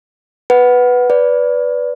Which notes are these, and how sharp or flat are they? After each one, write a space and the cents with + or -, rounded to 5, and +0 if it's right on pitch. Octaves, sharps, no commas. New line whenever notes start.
B4 +0 F#5 +0
B4 +0 D5 -15